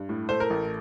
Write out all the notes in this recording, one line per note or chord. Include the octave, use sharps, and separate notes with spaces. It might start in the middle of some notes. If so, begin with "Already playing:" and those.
Already playing: G2
A2
A3 C5
A#4
A1